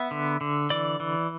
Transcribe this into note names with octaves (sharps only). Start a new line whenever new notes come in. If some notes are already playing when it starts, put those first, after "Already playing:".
Already playing: B3 E5
D3
D3
E3 D5
E3